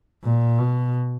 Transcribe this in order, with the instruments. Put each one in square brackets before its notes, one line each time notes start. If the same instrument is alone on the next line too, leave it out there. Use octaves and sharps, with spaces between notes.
[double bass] A#2
B2